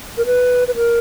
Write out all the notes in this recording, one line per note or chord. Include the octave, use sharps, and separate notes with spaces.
A#4
B4
B4
A#4